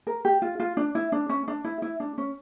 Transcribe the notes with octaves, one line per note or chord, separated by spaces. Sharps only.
A#4
G4
F4
F4
D4
E4
D4
C#4
D4
E4
E4
D4
C#4